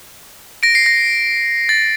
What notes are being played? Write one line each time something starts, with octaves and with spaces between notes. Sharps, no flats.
A#6 D7
C7
A#6
A6